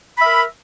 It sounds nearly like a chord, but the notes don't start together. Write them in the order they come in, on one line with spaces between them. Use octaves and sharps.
B5 E5 A#4